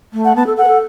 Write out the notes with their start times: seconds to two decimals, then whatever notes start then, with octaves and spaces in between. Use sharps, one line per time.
0.13 A3
0.24 F#5
0.35 B3 A5
0.46 A4
0.57 A4 F#5
0.64 B4
0.68 A4